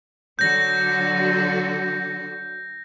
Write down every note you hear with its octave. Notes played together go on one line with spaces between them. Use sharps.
D3 F#3 F#4 G6 A#6